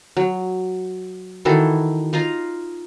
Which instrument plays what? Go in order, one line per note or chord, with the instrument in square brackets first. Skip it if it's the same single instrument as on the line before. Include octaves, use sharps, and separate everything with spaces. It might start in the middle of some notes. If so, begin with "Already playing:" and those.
[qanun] F#3
D#3 E3 F#4 A4
D#4 F4 D#5 A#5